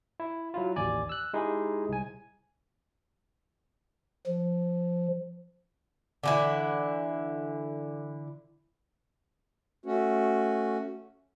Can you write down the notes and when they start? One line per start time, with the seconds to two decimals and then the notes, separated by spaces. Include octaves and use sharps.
0.20 E4
0.54 F#3 E4 F4
0.76 A1 D#2 D5 G#5
1.09 E6 F#6
1.34 G#3 D#4 E4 G4 G#4
1.89 C2 G#5
4.27 F3
6.23 D3 E3 E4
9.86 A3 C#4 F#4